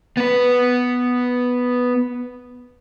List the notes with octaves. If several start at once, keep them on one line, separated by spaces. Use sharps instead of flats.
B3 B4